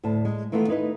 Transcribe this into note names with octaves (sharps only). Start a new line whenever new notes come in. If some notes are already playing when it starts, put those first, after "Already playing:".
D2 A2 A5
G#3
D#3 E3 A3 B3 F4
D#4 E4 B4 D#5